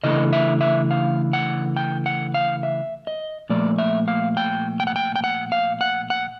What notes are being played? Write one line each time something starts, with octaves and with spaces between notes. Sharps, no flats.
C#3 E3 A3 D4 D#5
E5
E5
F5
F#5
G5
F#5
F5
E5
D#5
A#2 F3 A3 D5
E5
F5
G5
G5
F#5
G5
G5
F#5
F5
F#5
F#5